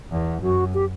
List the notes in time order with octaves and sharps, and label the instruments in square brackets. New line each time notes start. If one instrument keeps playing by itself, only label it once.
[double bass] E2
[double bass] F#2 [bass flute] F#4
[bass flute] G4